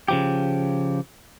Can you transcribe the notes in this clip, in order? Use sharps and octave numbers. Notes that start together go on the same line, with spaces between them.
C#3 F3 G4